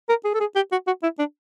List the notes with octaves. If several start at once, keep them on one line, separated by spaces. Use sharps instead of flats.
A#4
G#4
A4
G#4
G4
F#4
F#4
E4
D4